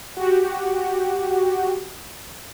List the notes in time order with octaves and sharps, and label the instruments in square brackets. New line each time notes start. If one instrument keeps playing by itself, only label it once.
[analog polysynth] F#4 G4